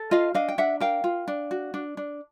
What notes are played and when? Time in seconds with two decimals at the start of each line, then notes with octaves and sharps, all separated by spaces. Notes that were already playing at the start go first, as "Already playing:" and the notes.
Already playing: A4
0.11 F4 D#5 F5
0.34 D4 D#5 F5
0.48 G5
0.58 D4 E5 F#5
0.80 A#4 F5 G5
1.04 F4
1.28 D4
1.51 F#4
1.74 D4
1.97 D4